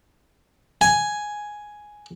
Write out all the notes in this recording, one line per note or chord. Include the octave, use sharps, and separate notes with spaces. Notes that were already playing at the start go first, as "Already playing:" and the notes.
G#5